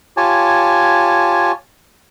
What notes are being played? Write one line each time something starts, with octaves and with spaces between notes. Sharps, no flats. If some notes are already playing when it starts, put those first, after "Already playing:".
F4 G4 C#5 G#5 A5